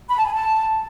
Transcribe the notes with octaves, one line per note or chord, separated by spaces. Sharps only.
B5
A5
G#5
A5